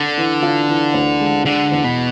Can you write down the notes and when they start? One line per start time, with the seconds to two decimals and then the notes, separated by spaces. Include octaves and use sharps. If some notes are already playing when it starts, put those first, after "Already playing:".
Already playing: D3 D4
0.17 E3
0.43 F4
0.68 E3
0.94 D2
1.20 G#3
1.45 D3 G#3
1.72 E2
1.84 B2